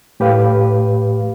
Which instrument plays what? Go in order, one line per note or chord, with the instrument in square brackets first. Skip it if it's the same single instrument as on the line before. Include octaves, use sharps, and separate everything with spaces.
[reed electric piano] A2 G4 B4 F5